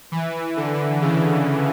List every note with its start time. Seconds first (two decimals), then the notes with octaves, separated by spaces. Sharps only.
0.12 E3
0.57 D3
1.01 C#3